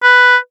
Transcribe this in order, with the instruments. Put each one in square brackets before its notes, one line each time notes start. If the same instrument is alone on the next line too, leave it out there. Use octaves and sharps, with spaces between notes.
[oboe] B4